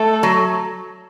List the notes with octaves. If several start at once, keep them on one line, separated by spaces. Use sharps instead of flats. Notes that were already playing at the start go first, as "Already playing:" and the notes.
Already playing: A3 A4
F#3